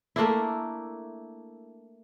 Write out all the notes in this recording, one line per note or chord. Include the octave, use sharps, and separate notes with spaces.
A3 A#3 D4 E4